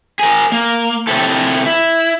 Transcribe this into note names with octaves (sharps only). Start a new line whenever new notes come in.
G#4 A#4
A#3
C3 C4 E4 A4
E4